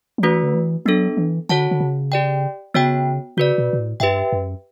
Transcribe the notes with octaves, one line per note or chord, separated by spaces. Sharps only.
F#3
E3 A3 C#4 F#4 B4
D3
E3
F#3 B3 D4 A4
E3
D3 F#4 C#5 F#5 A5
D3
C#3
G4 D5 G5
C#3 B3 F#4 C#5 G5
C#3 F#4 B4 D5
B2
B2
A2
G2 G4 B4 E5 G5
F#2